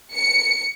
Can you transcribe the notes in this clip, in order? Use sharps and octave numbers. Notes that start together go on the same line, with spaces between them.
C#7